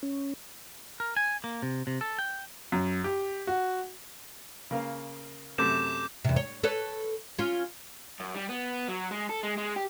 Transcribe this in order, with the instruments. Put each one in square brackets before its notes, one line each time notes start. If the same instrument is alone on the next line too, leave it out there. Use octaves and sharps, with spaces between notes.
[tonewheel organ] C#4
[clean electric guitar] A#4
G#5
A#3
C3
C3
A4
G5
[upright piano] F#2
G4
F#4
[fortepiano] C#3 A#3 F5
[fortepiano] F#2 C3 A3 [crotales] D6 G6 E7
[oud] E2 C3
C#5
A4 B4 C#5
C#4 F4
[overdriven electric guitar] F#2
G3
B3
F#3
G#3
A4
G#3
G#3
G4